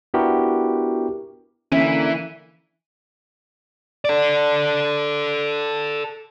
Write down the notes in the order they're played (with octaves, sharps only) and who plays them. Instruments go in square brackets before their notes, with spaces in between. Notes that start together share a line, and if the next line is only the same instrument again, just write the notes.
[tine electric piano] B3 D4 E4 F#4 G4 A#4
[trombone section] D3 A#3 [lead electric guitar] E3 [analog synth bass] C#4 [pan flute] E5
[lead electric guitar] A4 D5